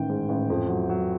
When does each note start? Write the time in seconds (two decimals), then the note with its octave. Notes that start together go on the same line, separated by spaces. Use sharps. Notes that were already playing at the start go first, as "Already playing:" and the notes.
Already playing: A1 D#3 G5
0.09 G#2
0.29 A1
0.50 F2
0.69 F#3
0.89 F#3